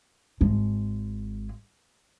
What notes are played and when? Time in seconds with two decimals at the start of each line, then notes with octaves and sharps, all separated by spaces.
0.41 G#1 G#3